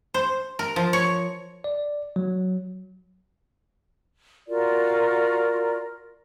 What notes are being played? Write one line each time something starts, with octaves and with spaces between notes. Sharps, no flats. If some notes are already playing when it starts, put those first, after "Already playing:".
C5
A#4
F3
C#5
D5
F#3
F4 F#4 A#4 D5